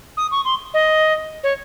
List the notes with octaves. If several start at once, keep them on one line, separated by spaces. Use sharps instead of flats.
D#6
C#6
C6
D#5
C#5